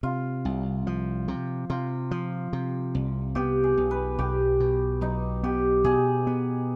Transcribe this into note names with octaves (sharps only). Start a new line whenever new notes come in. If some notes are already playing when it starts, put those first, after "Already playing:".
C3 F4
C2
F3
C3
C3 F4
F3
C3
C2
B3 G4
G#4
B1
B4
B1 G4
B2
B1 D#4
B3 G4
B2 G#4
B3